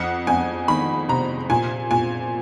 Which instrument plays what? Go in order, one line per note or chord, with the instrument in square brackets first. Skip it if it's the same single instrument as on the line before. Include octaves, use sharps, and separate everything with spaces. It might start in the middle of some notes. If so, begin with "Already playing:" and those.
Already playing: [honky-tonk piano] F2 F#5
F2 G#5
D#3 B5
C3 A#5
A#2 G#5
A#2 G#5